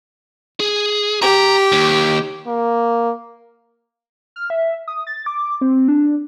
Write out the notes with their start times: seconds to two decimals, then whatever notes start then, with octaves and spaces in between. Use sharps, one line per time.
0.60 G#4
1.22 G4 A#5
1.72 D#2
2.47 A#3
4.36 F6
4.50 E5
4.88 D#6
5.07 A6
5.26 D6
5.61 C4
5.88 D4